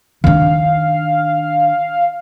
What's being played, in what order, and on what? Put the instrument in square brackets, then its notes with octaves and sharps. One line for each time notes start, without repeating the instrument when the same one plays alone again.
[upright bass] D#3 D4 [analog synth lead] F5